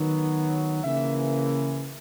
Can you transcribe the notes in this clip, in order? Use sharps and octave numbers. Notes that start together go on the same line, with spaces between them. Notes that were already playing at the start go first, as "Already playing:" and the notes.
Already playing: D#3 F#3 B3
C#3 E3 A#3 E5